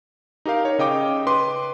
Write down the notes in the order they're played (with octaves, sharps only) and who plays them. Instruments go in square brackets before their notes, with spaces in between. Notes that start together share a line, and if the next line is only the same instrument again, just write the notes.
[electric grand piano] D#4 G4 A#4 F5
C#5
C#3 D#5 G5 D6
B4 C6 D6